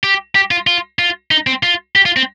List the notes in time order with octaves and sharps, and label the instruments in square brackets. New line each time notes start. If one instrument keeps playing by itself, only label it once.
[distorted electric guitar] G4
G4
F4
F4
F4
D#4
C4
F4
G4
F4
C4